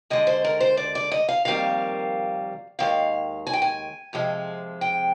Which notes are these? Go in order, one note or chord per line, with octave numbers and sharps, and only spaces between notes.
D#2 D3 G#3 D#5
C5
A#4
C5
D5
D5
D#5
F5
F2 D#3 G3 A#3 F5
D#2 D#3 G#3 F5
G#5
G5
G#5
F2 C3 F3 G#3
G5